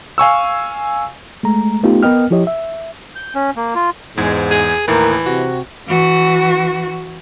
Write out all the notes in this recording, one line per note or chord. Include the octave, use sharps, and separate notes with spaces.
F5 G#5 C#6 E6
G#3 A3 A#5
A3 B3 D#4 F4 G4
B3 A#4 B4 D#5 G5 F6
F3 E4 G4 C#5 D#5
E5
G6
C#4
A#3
F4
E2 G#2 G#3 G#6
G#4
D#2 A2 E3 A#4
C3 F#4
E3 F#4